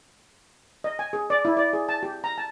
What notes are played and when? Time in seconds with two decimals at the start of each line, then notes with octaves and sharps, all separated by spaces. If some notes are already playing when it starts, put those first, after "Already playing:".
0.84 D#5
0.99 G#5
1.13 G#4
1.30 D5
1.45 E4
1.57 D5
1.73 G#4
1.89 A5
2.03 G4
2.24 A#5
2.38 A5